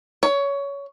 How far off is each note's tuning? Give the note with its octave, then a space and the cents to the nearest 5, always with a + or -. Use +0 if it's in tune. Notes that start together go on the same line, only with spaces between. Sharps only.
C#5 +20